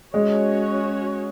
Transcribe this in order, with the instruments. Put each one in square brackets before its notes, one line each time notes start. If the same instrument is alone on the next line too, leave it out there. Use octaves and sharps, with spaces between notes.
[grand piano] G#3 [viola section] C#4 F#4 C#5